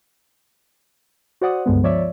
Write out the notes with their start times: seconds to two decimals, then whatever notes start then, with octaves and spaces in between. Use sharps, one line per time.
1.41 F#4 C5 D5 F#5 D#6
1.66 C#2 G2 D3 G#3 B3
1.83 F3 C#5 D5 E5